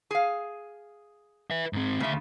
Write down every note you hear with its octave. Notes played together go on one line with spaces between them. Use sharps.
G#4 F5
B4 E5
G#2 C4
D2 C#3 F3 E5